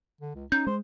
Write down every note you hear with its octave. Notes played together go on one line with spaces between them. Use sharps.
D3
C#2
C#4 D#4 G6
G#3 C5